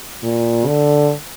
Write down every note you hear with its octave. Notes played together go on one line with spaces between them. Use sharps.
A#2
D3